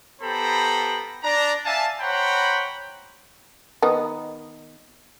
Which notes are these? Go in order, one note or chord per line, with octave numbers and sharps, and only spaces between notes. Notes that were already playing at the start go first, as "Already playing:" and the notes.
B3 G4 A4 C5 A#5 B5
D4 A#5
D5 E5 F5 G#5 A5
C5 C#5 F#5 G5 A#5 B5
D#3 B3 D#4